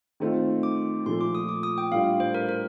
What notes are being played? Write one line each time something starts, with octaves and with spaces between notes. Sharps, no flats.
D#3 A3 C4 F4
D6
A#2 F3 A3 C6
D6
D#6
D6
D#6
G5
A2 G3 D4 F4 F5
C5
A#4
A#4